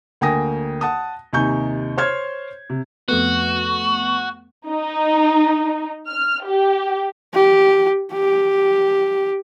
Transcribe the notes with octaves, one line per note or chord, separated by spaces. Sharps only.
D2 A#3 G5 G#5 D#6 A#6
F#5 A5 D#6
D#2 C3 D#4 G#5 C#6 G6
C5 C#5 C6 F6 G#6
C3
F2 A3 B3 F#4
D#4
F6
G4
G4
G4